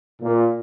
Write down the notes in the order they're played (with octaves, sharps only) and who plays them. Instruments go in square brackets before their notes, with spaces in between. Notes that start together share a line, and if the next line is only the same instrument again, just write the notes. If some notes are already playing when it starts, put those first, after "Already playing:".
[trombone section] A#2